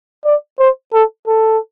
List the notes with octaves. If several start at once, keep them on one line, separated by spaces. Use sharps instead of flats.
D5
C5
A4
A4